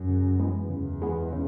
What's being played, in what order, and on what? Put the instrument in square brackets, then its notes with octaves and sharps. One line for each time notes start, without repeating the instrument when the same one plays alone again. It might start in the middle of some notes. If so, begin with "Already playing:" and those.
Already playing: [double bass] F#2
[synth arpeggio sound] C#3
E3 G#3 B3
[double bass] E2 [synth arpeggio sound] C#3
[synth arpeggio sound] E3 G#3 B3
C#3